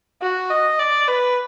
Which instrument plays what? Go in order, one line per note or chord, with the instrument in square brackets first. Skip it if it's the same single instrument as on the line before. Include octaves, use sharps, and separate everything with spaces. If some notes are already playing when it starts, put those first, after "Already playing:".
[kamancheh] F#4
D#5
D5
B4